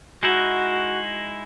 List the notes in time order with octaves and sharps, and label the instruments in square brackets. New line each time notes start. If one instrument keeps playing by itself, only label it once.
[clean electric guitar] G#3 D#4 E4 [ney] F#4